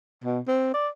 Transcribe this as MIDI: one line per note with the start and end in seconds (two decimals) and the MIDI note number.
0.24 0.40 47
0.47 0.73 60
0.74 0.88 74